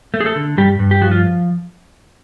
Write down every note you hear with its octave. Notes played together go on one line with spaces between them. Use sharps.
A3
G#4
A3 A4
D3
G2 G3 G4
G2
G4
F3 F#4
F4